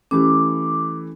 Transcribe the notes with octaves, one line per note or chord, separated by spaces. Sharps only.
E3 A3 C#4 G4 D6